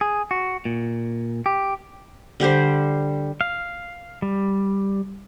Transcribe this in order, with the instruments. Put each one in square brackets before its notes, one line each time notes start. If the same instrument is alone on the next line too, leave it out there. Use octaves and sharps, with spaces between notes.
[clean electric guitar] G#4
F#4
A#2
G4
[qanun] D3 G3 G4 C5
[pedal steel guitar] F5
G3